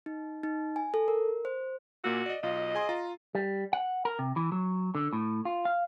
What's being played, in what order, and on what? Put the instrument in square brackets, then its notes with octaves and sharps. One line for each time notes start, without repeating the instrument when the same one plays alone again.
[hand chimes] D#4
D#4
G#5
A4
A#4
C5
[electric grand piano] A#2 A#3 E6 [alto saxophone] F#4
[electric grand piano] D5 D#5
[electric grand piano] B1 F4 [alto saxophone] D#5
[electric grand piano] G#4 G#5 C6
F4 A#5
[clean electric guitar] G3
F#5
A#4
C3
E3
F#3
D3
A2
F4
F5